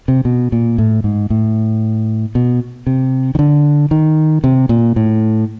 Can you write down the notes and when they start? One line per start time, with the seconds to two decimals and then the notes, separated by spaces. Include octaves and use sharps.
0.08 C3
0.25 B2
0.52 A#2
0.78 A2
1.04 G#2
1.30 A2
2.35 B2
2.87 C3
3.35 D#3
3.39 D3
3.91 D#3
4.44 C3
4.69 A#2
4.96 A2